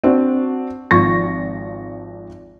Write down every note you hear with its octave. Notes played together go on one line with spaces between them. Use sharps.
C4 D4 F#4
G#1 F3 C#6 A#6